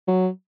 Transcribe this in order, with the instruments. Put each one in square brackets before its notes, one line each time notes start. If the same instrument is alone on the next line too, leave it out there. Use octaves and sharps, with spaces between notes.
[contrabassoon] F#3